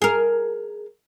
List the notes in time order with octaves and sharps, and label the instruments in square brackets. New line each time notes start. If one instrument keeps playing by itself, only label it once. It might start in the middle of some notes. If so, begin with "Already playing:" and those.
[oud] G#4 A#4